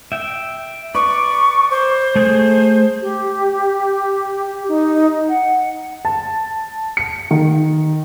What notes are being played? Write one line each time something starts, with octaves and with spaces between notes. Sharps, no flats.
E5 G5
B4 D5 C#6
C5
A3 G#4 G6
G4
D#4
F#5
A5
C#7
D#3